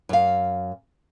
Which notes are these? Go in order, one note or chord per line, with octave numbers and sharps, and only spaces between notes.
F#2 F5